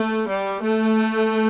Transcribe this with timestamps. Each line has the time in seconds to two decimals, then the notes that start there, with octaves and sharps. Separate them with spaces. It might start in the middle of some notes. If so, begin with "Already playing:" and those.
Already playing: A3
0.27 G3
0.62 A3